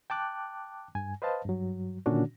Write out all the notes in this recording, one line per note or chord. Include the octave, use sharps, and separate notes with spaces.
G5 A5 D6 F#6
G2 G#5
B4 C5 D#5 F5 A5
G2 F#3
A#2 D3 D#3 C#4 D4 F#4